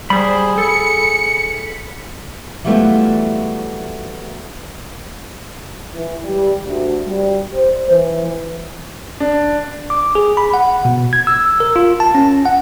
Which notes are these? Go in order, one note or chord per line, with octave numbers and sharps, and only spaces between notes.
G3 G#4 C5 B5
A4 C#7
E3 F#3 G3 A3 B3 F4
E3
G3
D2
G3
C5
E3
D4
D6
G#4
B5
F#5
B2
G#6
E6
A#4
F4
A5
C#4
F#5